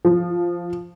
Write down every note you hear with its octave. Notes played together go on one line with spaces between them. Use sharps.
F3